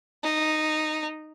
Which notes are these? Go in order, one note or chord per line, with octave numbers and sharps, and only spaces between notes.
D#4